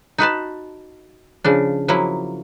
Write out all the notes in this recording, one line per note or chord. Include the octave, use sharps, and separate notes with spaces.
D#4 F#4 B4 A5
C#3 F3 D4
F3 F#3 A#3 E4